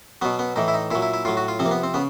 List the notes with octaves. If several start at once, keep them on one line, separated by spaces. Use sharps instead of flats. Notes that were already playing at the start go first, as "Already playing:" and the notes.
B2 F#3 B3
B3
A2 E3 D#4
E4
D#4
A#2 F#3 E4
E4
E4
A2 F#3 F4
F#4
F4
C3 F3 C4
A#3
B3
C4
C#3 B3